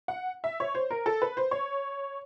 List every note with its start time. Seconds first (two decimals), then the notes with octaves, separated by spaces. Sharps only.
0.08 F#5
0.44 E5
0.60 C#5
0.75 C5
0.91 A#4
1.06 A4
1.22 B4
1.37 C5
1.51 C#5